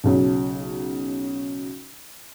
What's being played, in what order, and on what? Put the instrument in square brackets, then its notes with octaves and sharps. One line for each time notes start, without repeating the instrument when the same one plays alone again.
[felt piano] B1 C#3 F#3